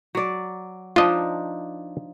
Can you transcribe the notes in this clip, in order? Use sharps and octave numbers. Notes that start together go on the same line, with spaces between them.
F#3 D5
F3 D4 D#4 F4 D#5